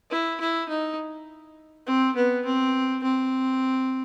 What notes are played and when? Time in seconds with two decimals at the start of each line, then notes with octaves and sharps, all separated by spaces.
0.11 E4
0.40 E4
0.69 D#4
1.87 C4
2.16 B3
2.45 C4
3.03 C4